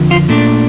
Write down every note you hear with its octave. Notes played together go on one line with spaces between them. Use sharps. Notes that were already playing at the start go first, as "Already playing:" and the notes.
Already playing: F2 D3 F3
F4
A#2 A3 D4